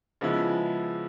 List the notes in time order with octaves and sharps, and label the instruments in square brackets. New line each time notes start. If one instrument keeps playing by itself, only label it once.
[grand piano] C#3 F3 G#3 B3 E4